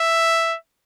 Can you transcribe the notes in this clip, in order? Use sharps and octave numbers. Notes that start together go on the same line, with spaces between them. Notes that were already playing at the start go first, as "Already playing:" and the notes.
Already playing: E5